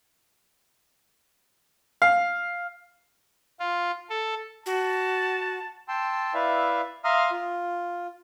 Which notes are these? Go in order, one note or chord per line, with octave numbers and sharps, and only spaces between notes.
F5
F4
A4
F#4 A5
G5 A5 C6 E6
E4 B4 D5 E5 F5
E5 F5 A#5 C6 D#6 F6
F4